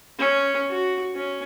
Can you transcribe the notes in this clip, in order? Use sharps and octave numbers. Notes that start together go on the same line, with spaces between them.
C#4
F#4
C#4